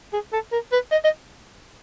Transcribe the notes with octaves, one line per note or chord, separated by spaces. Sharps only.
G#4
A4
A#4
B4
D#5
D#5